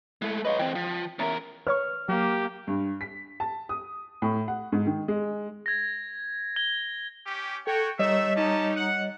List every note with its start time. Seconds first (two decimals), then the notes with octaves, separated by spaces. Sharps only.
0.22 G#3 A3 E4
0.45 B4 C#5 D#5 F5
0.59 E3 C4 G5
0.75 F3
1.19 E2 C#4 A#4 E5 A#5
1.67 B4 C#5 C#6 F6
2.09 F#3 A#3 G4
2.67 G2
3.01 B6
3.40 A5
3.69 D#6
4.22 A2
4.48 F#5
4.72 G#2
4.87 D#3
5.08 G#3
5.66 G#6 A#6
6.56 G#6 G7
7.27 C#4 G4
7.67 F#4 A4 C#5 G5
7.99 D#3 G3 A3 D#4 C#5 D#5 E5
8.36 C#4 D#4 G4 A5
8.76 F#5